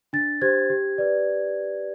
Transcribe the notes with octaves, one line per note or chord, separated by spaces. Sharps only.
D4 A6
G4 C5 G#6
G4
B4 D5